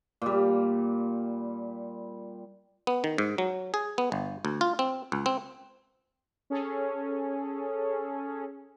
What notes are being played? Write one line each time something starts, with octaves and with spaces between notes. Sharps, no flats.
A#2 G3
B3
D#3
G#2
F#3
G#4
B3
G1
D2
F4
C4
C#2
C4
C#4 G#4 A4